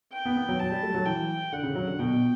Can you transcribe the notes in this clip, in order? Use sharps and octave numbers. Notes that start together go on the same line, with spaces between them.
G5
B3
B3
F#3
F#3 A5
G3
A3
F#3
E3 G5
D3 F#5
C#3
F#3
D3
B2 G5
B2